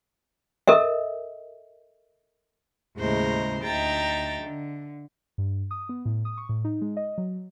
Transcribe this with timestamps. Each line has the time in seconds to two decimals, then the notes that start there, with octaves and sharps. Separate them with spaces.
0.68 A4 A#4 D#5 E5
2.98 D#2 A2 C#3 G#3 C5 A#5
3.62 D2 D#4 E5 G5 A#5 A6
4.41 D3
5.38 G2
5.71 D#6
5.89 B3
6.05 A2
6.25 D#6
6.38 C#6
6.49 A2
6.65 D#4
6.81 G#3
6.97 D#5
7.18 F#3